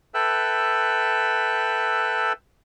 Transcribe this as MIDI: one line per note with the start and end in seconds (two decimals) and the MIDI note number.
0.14 2.33 69
0.14 2.33 71
0.14 2.33 76
0.14 2.33 79
0.14 2.33 88
0.14 2.33 90